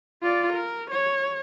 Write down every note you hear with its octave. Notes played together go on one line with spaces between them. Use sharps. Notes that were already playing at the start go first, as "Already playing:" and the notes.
F4 D5
A#4
C#5